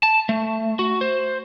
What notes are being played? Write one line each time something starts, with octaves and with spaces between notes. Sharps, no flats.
A5
A3
F#4
C5